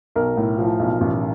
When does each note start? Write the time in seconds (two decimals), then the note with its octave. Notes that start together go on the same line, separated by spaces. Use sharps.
0.16 B1 A#4
0.37 A2
0.58 F3
0.80 B1
1.01 A1